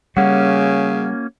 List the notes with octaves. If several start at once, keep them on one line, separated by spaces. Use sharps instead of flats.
C#3 G3 A#3 C#4 F#4 F#5